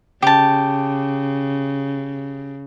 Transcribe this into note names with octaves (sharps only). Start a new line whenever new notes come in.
C#3 G4 A5